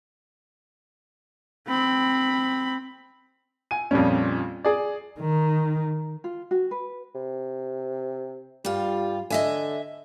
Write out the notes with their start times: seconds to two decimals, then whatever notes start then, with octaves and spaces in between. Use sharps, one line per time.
1.68 C4 B5
3.71 G#5 D#7
3.91 F2 A#2 F3 G3 C#4
4.65 G#4 D5
5.20 D#3
6.24 F4
6.51 F#4
6.71 B4
7.15 C3
8.65 G2 G3 F4
9.30 D3 D#5 E5 G#5